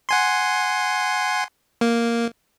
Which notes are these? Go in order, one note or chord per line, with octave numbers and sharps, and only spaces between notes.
F#5 G#5 C6
A#3